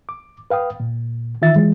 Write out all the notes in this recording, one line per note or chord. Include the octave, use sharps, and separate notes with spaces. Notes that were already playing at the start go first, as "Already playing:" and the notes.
D6
B4 F5 G5 D#6
A#2
D#3 E3 F4 E5 A6
E3 F#3 G#3